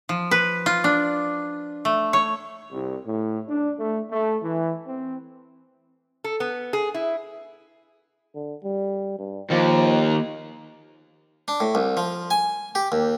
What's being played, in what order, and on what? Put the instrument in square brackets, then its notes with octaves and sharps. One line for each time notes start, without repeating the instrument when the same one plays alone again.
[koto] F3
B4
F4
D4
A3
C#5
[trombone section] C2
A2
D4
A3
A3
E3
C4
[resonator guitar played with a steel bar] A4
B3
G#4
E4
[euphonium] D3
G3
G2
[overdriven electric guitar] D#2 [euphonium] F3
[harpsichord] D4
A2
C2
F3
G#5
G4
D#2